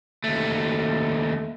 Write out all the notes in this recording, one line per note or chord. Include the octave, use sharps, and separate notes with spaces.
D#2 A3